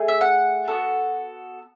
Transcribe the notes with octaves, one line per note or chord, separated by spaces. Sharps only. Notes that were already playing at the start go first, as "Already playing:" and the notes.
Already playing: A3 G#4
E5
F#5
B3 F#4 A4